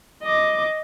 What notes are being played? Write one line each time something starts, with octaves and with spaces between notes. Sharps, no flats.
D#5 D6